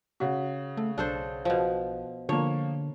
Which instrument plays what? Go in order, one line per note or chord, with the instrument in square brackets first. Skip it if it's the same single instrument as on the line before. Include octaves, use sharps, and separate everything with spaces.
[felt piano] C#3 F#4
[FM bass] A3
[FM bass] B1 [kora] D4 A4 C5
[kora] B2 F3
[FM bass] D3 [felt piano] F3 A#3 [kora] C#5